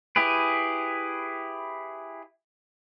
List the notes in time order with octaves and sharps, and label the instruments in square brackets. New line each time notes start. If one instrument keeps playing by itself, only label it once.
[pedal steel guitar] E4 G4 G#4 B4